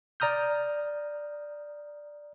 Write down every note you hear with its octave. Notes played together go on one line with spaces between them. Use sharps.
D5 A#5 D#6 F6 G6